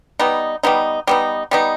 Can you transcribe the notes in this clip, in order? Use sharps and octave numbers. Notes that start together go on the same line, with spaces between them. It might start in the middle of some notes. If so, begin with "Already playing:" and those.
G3 B3 D#4
G3 B3 D#4
G3 B3 D#4
G3 B3 D#4